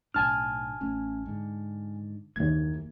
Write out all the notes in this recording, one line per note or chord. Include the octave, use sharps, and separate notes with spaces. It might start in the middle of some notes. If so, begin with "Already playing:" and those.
B1 A2 D4 G#5 A5 F6
A1 A3 C#4
G#2 D3
F#1 D#2 E3 A#3 G#6